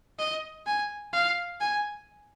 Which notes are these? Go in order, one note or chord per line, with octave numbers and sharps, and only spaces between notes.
D#5
G#5
F5
G#5